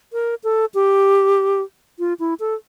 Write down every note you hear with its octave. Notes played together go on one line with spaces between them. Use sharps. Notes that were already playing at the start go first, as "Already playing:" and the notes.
A#4
A4
G4
F4
E4
A4